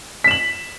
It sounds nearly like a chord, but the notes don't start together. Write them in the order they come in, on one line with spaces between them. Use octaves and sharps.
B6 E7 F#7